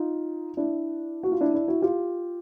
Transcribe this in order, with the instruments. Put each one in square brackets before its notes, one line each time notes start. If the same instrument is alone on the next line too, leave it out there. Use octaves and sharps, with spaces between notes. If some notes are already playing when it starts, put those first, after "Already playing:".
Already playing: [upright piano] D#4 F4
D4 E4
F#4
F4
D4 E4
D4 E4
E4 F#4
F4 G4